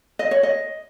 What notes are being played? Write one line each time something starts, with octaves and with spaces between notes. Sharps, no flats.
D#5
C#5
D#5